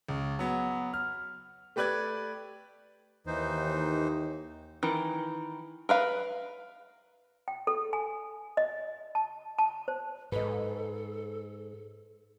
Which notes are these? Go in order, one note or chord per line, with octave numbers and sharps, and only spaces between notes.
C#2
F#3 B3
F6
A3 G4 B4 D5 F#6 G#6
D#2 E3 D#4 C5
D#3 E3
A#4 B4 F5
G5
A4
G#5
D#5
A5
A5
C5
G#2 A4 B4 D#5